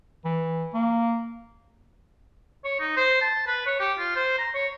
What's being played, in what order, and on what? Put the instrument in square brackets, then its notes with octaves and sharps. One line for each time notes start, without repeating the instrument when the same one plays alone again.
[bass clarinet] E3
A#3
[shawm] C#5
D#4
C5
A5
B4
C#5
G4
F4
C5
A#5
C#5